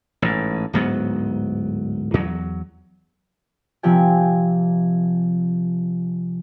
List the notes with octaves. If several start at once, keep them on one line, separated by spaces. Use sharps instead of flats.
A1 G#2
D1 G#2 F#3 B3
E2 F#3
C3 F3 C4 G4 D5 G#5